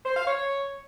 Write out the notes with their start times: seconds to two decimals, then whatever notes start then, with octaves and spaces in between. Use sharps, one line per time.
0.05 C5
0.16 F5
0.27 C#5